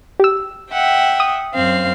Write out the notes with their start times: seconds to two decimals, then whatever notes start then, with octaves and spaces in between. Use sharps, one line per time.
0.20 G4 E6
0.71 E5 F#5 G5
1.20 D#6
1.54 F#2 C4 F5